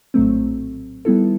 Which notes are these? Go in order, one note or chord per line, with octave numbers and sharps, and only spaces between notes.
A#1 A2 F#3 A3 C4
D#3 G3 B3 E4 A4